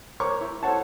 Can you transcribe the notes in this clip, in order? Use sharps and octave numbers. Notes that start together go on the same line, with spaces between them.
A#4 C5 C#5 C#6 D6
E4
A4 C5 C#5 F#5 A5